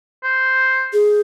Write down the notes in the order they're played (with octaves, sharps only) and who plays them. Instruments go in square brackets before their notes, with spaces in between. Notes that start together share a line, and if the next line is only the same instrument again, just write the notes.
[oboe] C5
[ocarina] G#4